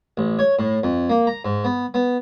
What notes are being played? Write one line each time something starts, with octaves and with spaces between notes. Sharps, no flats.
A1
C#5
A2
F2
A#3
A#5
G#2
B3
B3